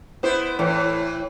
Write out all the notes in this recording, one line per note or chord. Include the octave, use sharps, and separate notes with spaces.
B3 E4 C5
A2 E3